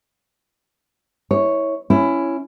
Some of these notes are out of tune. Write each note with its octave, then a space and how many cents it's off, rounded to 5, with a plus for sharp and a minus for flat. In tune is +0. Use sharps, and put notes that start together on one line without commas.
E4 -20 C#5 +0
C#4 +0 E4 +15